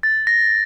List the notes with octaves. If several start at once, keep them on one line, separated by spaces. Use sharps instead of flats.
A6
A#6